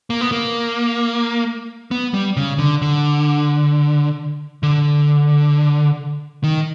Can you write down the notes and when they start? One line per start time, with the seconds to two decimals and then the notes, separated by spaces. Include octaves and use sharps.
0.10 A#3
0.21 B3
0.32 A#3
1.91 B3
2.14 G3
2.37 C#3
2.59 D3
2.82 D3
4.63 D3
6.44 D#3